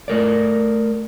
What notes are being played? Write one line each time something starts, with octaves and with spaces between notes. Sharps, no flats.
A3 A#4 D5